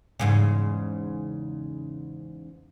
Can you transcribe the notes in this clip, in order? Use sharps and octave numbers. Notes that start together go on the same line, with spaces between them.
E2 G#2 C#3